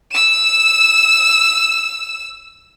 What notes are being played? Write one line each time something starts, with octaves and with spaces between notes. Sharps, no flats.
E6 E7